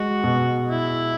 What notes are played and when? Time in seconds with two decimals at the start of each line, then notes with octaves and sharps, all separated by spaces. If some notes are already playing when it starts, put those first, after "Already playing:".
Already playing: G#3 F#4
0.24 B2
0.70 E4